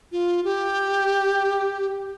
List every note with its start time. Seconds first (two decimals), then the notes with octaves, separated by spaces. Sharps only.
0.12 F4
0.44 G4